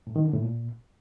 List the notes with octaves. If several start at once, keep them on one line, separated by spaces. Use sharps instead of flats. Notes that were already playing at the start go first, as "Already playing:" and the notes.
A2
D#3
D3
A2
A#2